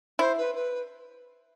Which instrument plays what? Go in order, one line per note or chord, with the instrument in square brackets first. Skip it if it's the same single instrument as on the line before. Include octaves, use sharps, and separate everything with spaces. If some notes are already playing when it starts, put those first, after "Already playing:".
[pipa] E4 [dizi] C5
[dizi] B4
B4